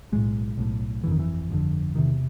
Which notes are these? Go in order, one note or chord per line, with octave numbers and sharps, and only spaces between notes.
B1 A2 G#3
B1 A2
G1 F2 D3 E3
D#3
E3
G1 F2 D3
E1 E2 C3 D#3